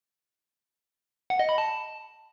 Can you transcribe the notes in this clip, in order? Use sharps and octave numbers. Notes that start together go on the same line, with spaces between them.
F#5
D#5
B5
A5